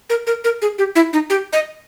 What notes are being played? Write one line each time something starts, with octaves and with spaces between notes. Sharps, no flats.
A#4
A#4
A#4
G#4
G4
E4
D#4
G4
D#5